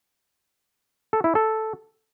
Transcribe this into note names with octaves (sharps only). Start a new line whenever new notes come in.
A4
E4
A4